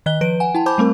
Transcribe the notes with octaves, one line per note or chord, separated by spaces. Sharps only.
D#3 D#5 F#6 G7
F3 B4 D7
F#5 G#5
E4 G5 A5
C5 G#5 A5 B5 D6 G6
G3 A3 C4 A#4